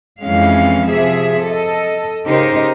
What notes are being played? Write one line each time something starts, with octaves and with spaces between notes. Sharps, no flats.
F2 E3 G#3 C#4 F5
C3 F3 G#4 E5
A4 D#5
C#3 D#4 G4 A#4 C5